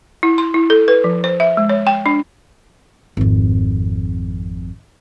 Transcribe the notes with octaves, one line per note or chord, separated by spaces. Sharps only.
E4
C6
E4
A4
B4
F3
C5
E5
G#3
C#5
G5
D4
G#1 F2